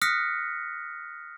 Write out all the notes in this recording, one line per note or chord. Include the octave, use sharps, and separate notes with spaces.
D#6 F6 F#6 A#6 B6 C#7